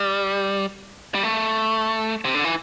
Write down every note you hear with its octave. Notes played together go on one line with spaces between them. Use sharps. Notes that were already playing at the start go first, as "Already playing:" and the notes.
Already playing: G3
G3
A3
C3
D3
E3